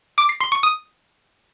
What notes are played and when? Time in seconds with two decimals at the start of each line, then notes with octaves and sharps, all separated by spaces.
0.18 D6
0.29 C7
0.40 C6
0.52 C#6
0.63 D#6